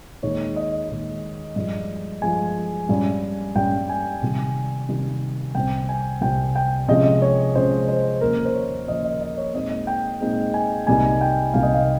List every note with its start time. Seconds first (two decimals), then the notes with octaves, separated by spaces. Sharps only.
0.22 D#2 D#3 G#3 D#4 C#5
0.56 D#5
0.89 D#2 D#3 G#3 D#4
1.56 G2 F3 G#3
2.22 G2 F3 G#3 G#5
2.89 G2 G3 C#4
3.55 G2 G3 C#4 G5
3.89 G#5
4.22 C3 D#3 G3
4.89 C3 D#3 G3
5.55 C2 C3 G3 C4 G5
5.89 G#5
6.21 C2 C3 G3 C4 G5
6.56 G5
6.88 C3 F3 G#3 C#4 D#5
7.22 C#5
7.55 C3 F3 G#3 C#4 C5
7.89 C5
8.21 D#2 C#3 F3 A#3 A#4
8.45 C5
8.55 C#5
8.87 D#2 C#3 F3 A#3 D#5
9.05 D#5
9.21 D#5
9.38 C#5
9.54 A#2 G#3 C4 D#4 D#5
9.87 G5
10.21 A#2 G#3 C4 D#4
10.54 G#5
10.87 C2 C3 G3 A#3 D#4 G#5
11.21 G5
11.53 C2 C3 G3 A#3 D#4 F5
11.63 D#5
11.73 F5